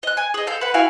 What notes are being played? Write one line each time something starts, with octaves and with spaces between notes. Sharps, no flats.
D#5 F#6
G#5
G#4 D#5
A4 F5 G6
B4 F#5
E4 F#4 F5 G#5